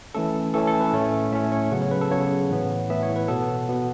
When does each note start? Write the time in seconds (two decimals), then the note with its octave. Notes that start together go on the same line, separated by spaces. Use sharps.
0.15 E3 A3 C#4 A4
0.54 E3 A3 C#4 A4
0.67 A4
0.80 B4
0.93 A2 A3 C#4 C#5
1.32 A2 A3 C#4 E5
1.52 C#5
1.71 C#3 F#3 B3 F#5
1.82 C#5
1.91 B4
2.01 A4
2.11 C#3 F#3 B3 C#5
2.50 A2 E3 B3
2.89 A2 E3 B3 E5
3.03 C#5
3.16 B4
3.28 B2 B3 A4
3.68 B2 B3